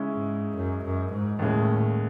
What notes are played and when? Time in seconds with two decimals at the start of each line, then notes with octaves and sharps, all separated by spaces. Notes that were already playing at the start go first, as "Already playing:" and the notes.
Already playing: C#3 G#3 C#4 E4
0.13 G#2
0.55 F#2
0.84 F#2
1.12 G#2
1.39 D#2 A2 C#3 G#3